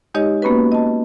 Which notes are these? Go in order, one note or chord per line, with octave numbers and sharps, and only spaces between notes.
G#3 D#4 G4 C#5 D#5
A#3 B3 C#4 F#4 B4
D#5 A5